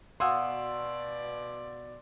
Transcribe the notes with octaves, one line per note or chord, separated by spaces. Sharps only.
B2 F#4 D5 F5 G#5 C6 D#6 E6